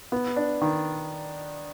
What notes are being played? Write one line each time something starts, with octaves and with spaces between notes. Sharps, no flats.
B3
D4
D#3